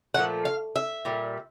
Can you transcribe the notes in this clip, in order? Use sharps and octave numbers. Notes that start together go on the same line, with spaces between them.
A#2 F3 A3 F#5
F5
E5
A#2 G3